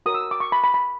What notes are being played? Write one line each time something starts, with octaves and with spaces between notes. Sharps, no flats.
F#4 A#4 C#5 D#6
E6
D6
C#6
B5
B5
B5